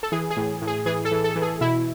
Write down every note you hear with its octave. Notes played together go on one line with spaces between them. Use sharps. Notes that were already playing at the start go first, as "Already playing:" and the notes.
A4
E3 G#4
G#4
A2
A2
G#4
E3 G#4
A4
E3
A4
E3
G#4
B2 E4